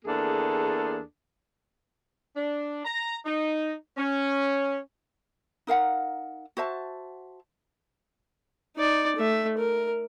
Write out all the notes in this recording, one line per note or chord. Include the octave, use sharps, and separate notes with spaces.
E2 A#3 D4 G#4 A4
D4
A#5
D#4
C#4
D#4 A#4 F5 F#5
F#4 C5 E5 A5
D#4 D5
A3 E5
A#4